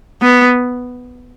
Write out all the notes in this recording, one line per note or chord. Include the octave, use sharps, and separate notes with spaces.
B3